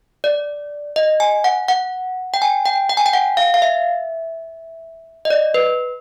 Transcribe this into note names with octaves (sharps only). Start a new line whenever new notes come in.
D5
D#5
G#5
F#5
F#5
G5
G#5
G5
G5
G#5
G5
F#5
F5
F5
E5
D#5
D5
B4